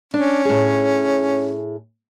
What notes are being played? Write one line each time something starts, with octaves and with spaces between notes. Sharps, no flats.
C#4 D4
A2 G#4